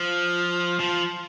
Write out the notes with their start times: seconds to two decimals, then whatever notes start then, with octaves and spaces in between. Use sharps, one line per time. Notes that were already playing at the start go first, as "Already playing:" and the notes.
Already playing: F3
0.80 F3